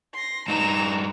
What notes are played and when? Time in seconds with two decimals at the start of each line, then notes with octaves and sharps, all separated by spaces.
0.14 C6 A#6
0.48 G2 D#4 A#5 E7